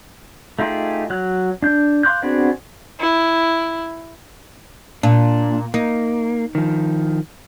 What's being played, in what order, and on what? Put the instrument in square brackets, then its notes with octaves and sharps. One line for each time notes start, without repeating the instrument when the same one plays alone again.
[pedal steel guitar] A3 D#4 F4 G4 G#4
F#3 F#6
D4 G6
F5 C6 D6 F#6 G6
B3 C4 D4 F#4 G#4
[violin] E4
[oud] A#2 [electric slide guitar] D4
[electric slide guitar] A#3 [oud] D#4
[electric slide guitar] D#3 F3